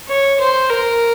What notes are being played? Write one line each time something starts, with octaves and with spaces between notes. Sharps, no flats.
C#5
C5
A#4